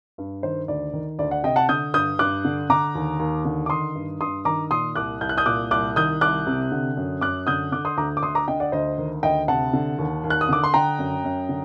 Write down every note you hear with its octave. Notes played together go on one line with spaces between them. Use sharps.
G2
D#3 C5
D2 D5
D#3
D2 D5
D5 F#5
C3 D#5 G5
F#5 A5
D3 D#6 G6
G2 D#6 G6
G2 D6 F#6
D3
D3 A#5 D6
D#2
D#2
D3
D6
D#3 C6 D#6
G2
G2 C6 D#6
D#3 A#5 D6
A#2 C6 D#6
C2 D6 F#6
C2 G6
F#6
D#6 G6
A#2 D6 F#6
C2 D6 F#6
D#3 D#6 G6
C2 D6 F#6
C3
D3
F#2
F#2 D6 F#6
D3 D#6 G6
D3 D6 F#6
C6 D#6
D2 A#5 D6
D6
D2 C6 D#6
A#5 D6
D3 D#5 G5
D5 F#5
D2 C5 D#5
D#3
D2 D#5 G5
C3 F#5 A5
D3
D#2
D#2
F#6
D#6
D3 D6
C6
D3 G5 A#5
F#2
F#2
D3